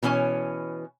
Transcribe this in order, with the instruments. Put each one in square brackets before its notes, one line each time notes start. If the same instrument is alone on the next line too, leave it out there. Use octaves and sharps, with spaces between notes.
[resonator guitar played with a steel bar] B2 E3 C#4 C#5 G#5